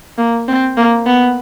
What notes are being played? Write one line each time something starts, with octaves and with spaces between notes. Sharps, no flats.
A#3
C4
A#3
B3